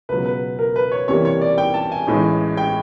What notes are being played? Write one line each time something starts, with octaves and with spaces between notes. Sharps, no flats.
C#2 B2 F#3 B4
B4
A#4
B4
C#5
C2 C3 E3 G3 A#3 C#5
C#5
D5
G5
A5
G#5
A1 A2 E3 G#3
G5